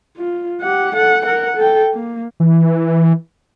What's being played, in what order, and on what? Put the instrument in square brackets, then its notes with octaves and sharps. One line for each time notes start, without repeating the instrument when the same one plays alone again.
[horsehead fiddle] F4
G4 F#5
A4 F#5
A#4 F#5
A4 G5
A#3
[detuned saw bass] E3